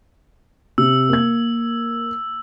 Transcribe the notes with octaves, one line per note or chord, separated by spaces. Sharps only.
C3 E6
A#3 G#6